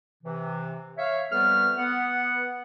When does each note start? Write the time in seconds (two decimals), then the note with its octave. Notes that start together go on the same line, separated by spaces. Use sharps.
0.24 C3 E3
0.97 C#5 E5 F5
1.30 F2 G3 A3 B3 B4 F6
1.77 B3 F#5